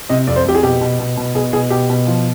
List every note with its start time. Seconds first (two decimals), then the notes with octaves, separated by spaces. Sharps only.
0.09 C3 D#5
0.27 F2 D5
0.36 C5
0.45 F2 G4
0.55 G#4
0.63 B2 G4
0.81 B2
0.99 B2
1.17 B2
1.35 B2 G#4
1.53 B2 G#4
1.70 B2 G4
1.90 B2
2.07 F3